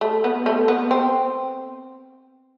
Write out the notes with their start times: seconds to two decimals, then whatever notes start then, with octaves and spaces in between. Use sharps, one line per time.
0.01 A3
0.24 B3
0.46 A3
0.68 B3
0.91 C4